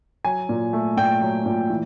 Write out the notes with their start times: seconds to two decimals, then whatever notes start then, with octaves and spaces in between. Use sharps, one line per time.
0.25 F#3 G#5
0.49 A#2
0.73 A3
0.97 A#2 G5
1.21 F#3
1.46 A#2
1.70 E3